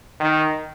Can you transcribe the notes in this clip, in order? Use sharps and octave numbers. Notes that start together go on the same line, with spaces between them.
D#3